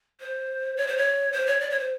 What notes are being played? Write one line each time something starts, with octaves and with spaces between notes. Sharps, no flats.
C5
C#5
C5
C#5
C5
C#5
D5
C#5
C5